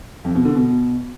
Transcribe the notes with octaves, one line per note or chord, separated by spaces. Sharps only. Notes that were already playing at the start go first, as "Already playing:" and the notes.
F2
B2
D3
B2